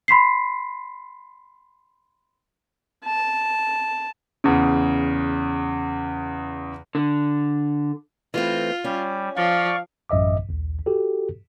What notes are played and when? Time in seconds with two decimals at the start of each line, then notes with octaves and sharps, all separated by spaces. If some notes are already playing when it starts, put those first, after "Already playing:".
0.08 B5 C6 B6 C7
3.04 A5
4.44 E2 C#3
6.95 D3
8.34 E3 A3 C4 F4
8.84 G3 C#4
9.37 F3 D5 F5 C#6
10.09 A1 F#2 D#5 E5 D6
10.49 A#1 D#2
10.86 F#4 G4 A4